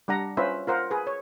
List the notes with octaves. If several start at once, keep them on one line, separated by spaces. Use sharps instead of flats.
G3 D4 F#5 A#5
C#4 F4 B4 C5 E5
F4 A#4 C5 F#5
G#4 B4
C#5